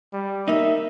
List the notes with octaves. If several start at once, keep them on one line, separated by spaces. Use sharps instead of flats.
G3
A#3 D#4 E5